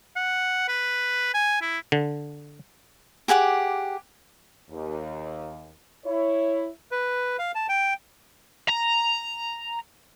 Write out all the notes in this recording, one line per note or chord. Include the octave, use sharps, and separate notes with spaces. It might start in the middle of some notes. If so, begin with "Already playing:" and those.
F#5
B4
G#5
E4
D3
G4 G#4 F#5 D6
D#2
E4 C#5
B4
F5
A5
G5
A#5